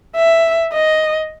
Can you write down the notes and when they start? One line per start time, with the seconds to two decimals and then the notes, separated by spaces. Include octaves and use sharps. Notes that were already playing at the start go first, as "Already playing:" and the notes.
0.16 E5
0.73 D#5